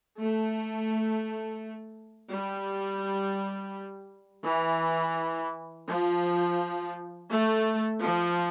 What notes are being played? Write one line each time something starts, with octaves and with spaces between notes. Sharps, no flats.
A3
G3
E3
F3
A3
F3